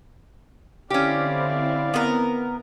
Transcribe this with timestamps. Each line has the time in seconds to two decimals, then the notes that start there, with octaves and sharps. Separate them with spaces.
0.90 D3 C4 C#4 E4 G4 D5 F5
1.94 B3 A#4